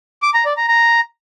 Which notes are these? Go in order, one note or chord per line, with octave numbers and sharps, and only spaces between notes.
D6
A#5
D5
A#5
A#5